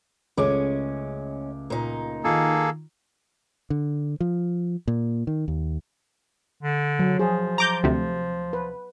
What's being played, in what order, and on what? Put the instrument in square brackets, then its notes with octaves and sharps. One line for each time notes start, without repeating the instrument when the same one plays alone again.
[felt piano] C#2 A3 D6 [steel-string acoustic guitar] G#3 C#4
[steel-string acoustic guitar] A#2 D#4
[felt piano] D#3 F4 [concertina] A#3 G#4 A4
[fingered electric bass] D3
F3
A#2
D#3
D#2
[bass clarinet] D3
[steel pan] F#3
[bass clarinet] F3 [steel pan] G#4
[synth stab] A#5 D6 G6
D2 C3
[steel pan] B4